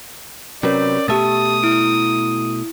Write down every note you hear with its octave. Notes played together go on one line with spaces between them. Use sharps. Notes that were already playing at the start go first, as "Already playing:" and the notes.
C3 F#3 C#4 A#4 B4 C#5 D5
B2 A3 G4 E5 A5 D#6 A6
E4 D7